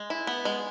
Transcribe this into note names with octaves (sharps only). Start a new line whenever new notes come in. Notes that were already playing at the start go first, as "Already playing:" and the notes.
Already playing: G#3
E4
B3
G#3